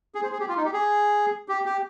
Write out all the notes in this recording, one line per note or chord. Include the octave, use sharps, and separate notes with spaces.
G#4
C5
G#4
G4
F4
D#4
G4
G#4
G4
G4